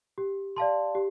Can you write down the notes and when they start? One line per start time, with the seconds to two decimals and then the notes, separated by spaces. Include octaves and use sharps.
0.18 G4
0.56 D5 F5 A5 C6
0.95 G4